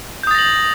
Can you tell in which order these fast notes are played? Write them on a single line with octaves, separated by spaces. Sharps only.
G6 D#6 A6 A#6 F#7